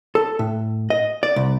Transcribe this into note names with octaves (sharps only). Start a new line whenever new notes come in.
A4
A2
D#5
D5
C2